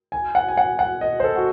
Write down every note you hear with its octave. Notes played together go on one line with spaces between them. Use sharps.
G#5
F#5
G#5
F#5
F#5
D#5
C5
A4
F#4